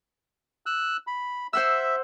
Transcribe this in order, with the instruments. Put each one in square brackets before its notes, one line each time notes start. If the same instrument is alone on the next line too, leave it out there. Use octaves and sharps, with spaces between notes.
[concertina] E6 F#6
B5
[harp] C5 F#5 E6 [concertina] E5